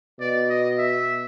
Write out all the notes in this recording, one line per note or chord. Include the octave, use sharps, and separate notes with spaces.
B2 D5
D#5
E5